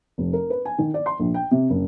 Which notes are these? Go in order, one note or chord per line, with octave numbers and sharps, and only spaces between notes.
F1
A#4
B4
G#5
D#3
D5
C6
A#1
G5
C3
F#1